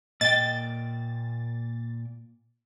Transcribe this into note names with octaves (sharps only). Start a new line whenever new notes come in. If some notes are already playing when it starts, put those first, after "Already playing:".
A#2 A#3 D#5 G5 A6